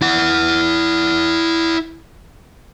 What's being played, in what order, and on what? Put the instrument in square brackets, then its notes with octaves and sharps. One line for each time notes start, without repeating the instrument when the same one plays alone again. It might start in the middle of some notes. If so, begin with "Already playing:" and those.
[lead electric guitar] E4 F#5